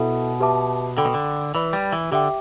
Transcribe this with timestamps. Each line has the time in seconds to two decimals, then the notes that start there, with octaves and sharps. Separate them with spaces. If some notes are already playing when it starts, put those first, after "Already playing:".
Already playing: B2 E4 A4 E5
0.40 G4 B4 E5 A5 D6
0.97 D3 A4 G5 B5 D6
1.05 B2
1.14 D3
1.55 E3 B4 D5 B5
1.73 G3
1.93 E3
2.11 D3 G4 E5 G5 D6